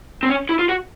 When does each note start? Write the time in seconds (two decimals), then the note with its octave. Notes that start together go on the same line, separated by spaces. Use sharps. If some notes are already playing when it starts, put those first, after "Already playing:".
0.23 C4
0.29 C#4
0.49 E4
0.59 F4
0.69 F#4